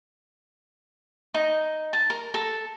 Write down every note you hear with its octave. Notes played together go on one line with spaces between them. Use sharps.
D#4
A5
A#4
A4